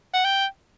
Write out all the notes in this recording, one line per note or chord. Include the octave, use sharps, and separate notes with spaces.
F#5
G5